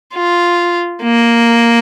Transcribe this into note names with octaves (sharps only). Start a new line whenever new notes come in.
F4
A#3